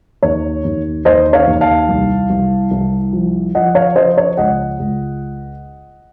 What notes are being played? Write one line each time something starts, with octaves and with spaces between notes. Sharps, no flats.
D#2 C#5
D#2
D#2 C5 D#5
C#5 F5
D#2
F5 A5
C2
C2
C2
F3
F3 D#5 F#5
C#5 F5
F3 C5 D#5
C#5
C#2 D#5 F#5
C#2